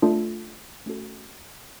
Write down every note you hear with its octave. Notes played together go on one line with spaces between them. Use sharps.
A3 D4 F4 A4
A3 C#4 F#4 A4